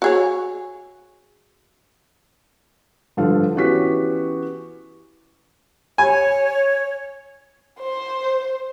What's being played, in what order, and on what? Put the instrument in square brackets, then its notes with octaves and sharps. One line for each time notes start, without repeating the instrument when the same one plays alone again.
[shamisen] F#4 G#4 C#5
[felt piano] G2 D3 F3 A4 F5
E3 B3 C#4 F#4 G4 B6
[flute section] C#5 [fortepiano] G#5
[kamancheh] C5